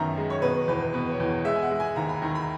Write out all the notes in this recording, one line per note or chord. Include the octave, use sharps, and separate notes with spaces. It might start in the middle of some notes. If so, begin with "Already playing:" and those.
Already playing: F#2 D#3 B3 E5 A#5
G#3
C#5
B2 B4
E2 B4
B2 B4
C#5
E2
G#3 E5
G#5
F#5
G#3
G#5
D#2 A#5
B5
D#3 A#5
B5